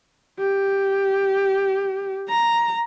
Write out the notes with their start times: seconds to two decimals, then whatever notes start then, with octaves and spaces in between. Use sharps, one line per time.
0.39 G4
2.28 A#5